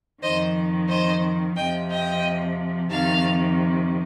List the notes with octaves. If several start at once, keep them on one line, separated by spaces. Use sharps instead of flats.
F2 D#3 C5 D#5
C5 D#5
F2 C3 F3 D#5 G5
D#5 G5
F2 C3 D#3 F5 A5